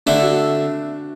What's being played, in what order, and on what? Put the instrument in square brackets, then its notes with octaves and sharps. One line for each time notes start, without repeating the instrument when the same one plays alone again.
[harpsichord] D3 A3 E4 [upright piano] D4
[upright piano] F#4